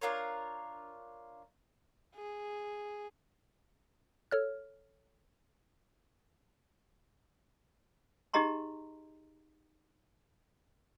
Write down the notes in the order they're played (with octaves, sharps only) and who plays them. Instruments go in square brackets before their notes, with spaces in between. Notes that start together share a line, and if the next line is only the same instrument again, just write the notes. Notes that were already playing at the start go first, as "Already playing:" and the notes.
[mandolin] D4 F4 A#4 C#5
[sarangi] G#4
[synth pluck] A4 C#5 F6
[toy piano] D#4 G4 G#4 D#5 A#5 C6